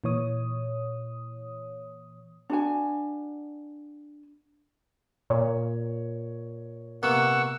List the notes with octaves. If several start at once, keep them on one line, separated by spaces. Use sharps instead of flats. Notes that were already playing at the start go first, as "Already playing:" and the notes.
A#2 E3 C#5 D#6
D4 F#4 G#5
A#2 C#5
C3 A#3 B3 F#5 C#6 E6